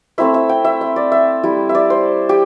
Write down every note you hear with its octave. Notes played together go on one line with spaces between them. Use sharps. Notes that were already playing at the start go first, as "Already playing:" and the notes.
A3 C4 E4 E5
E5
G5
E5
E5
D5
E5
G3 E4
E5
D5
C5
G4